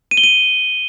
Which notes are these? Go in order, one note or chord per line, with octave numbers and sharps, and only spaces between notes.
D#7
G7
D#7